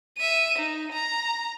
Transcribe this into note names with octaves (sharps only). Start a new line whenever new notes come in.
E5 D#7
D#4
A#5